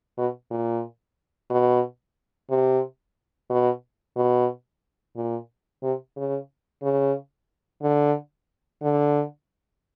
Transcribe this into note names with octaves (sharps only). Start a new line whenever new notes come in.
B2
A#2
B2
C3
B2
B2
A#2
C3
C#3
C#3
D3
D3